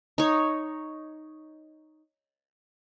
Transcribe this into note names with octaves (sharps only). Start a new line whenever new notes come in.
D#4 C#5